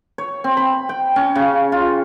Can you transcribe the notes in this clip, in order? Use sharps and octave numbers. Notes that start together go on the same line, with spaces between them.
C#5
C4
B5
G5
C#4
C#3
F4